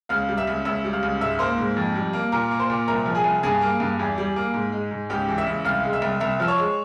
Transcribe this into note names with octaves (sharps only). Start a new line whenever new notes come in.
C#2 F5 F6
G3
E5 E6
C#2
C#2 E5 E6
G3
F5 F6
C#2
G#2 E5 E6
A#3 C5 C6
G#2
F2
G3
A#3
A#2 A#4 A#5
A#3
C5 C6
A#2
C2 A#4 A#5
F3
G#4 G#5
C2
G2 G#4 G#5
A#3
G2
E2
G3
A#3
G#2
G#3
G#2
C#2 G4 G5
E3
E5 E6
C#2
C2 F5 F6
G#3
E5 E6
C2
C2 E5 E6
F3 E6
C#5 C#6
G#3